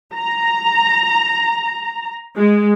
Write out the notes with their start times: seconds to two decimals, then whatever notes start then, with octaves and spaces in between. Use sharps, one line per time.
0.15 A#5
2.36 G#3